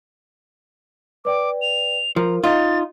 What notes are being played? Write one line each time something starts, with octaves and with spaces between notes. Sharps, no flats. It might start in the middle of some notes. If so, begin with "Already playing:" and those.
B4 D5 G5 D6
F7
F3 A#4 A#5
D#4 F4 D#5 A6